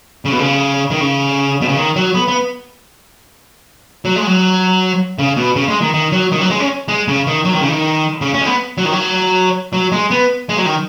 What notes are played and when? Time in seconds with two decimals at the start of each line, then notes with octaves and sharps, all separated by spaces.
0.25 C#3
0.32 B2
0.39 C#3
0.90 D#3
1.01 C#3
1.61 B2
1.68 C#3
1.76 D#3
1.96 F#3
2.14 B3
2.28 B3
4.05 F#3
4.16 G#3
4.27 F#3
5.19 C#3
5.37 B2
5.56 C#3
5.68 G#3
5.81 D#3
5.94 D#3
6.12 F#3
6.32 D#3
6.41 F#3
6.50 G#3
6.60 C#4
6.88 G#3
7.08 C#3
7.27 D#3
7.45 F#3
7.53 D#3
7.61 C#3
7.68 D#3
8.21 C#3
8.34 C#4
8.41 G#3
8.46 B3
8.78 F#3
8.85 D#3
8.92 F#3
9.73 F#3
9.92 G#3
10.11 B3
10.49 G#3
10.57 F#3
10.66 D#3